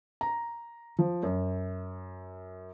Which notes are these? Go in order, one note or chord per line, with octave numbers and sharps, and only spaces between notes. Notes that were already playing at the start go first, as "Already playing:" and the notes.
A#5
F3
F#2